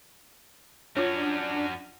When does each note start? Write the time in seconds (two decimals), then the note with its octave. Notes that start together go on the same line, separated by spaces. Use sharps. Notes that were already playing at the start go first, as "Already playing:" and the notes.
0.97 F#2 C#4 D4 F4 C#5